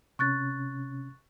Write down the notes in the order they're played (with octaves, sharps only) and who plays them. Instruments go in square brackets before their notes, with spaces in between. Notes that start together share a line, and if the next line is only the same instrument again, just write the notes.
[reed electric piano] C3 C#4 [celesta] C#6 F#6 A6